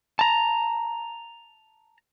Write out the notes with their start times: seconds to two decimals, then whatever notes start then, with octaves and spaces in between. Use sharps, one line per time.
0.19 A5 A#5